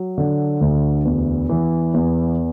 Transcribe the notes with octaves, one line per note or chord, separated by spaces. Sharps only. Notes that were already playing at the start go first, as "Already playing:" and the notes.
Already playing: F#3
D3
D2
E2
E3
E2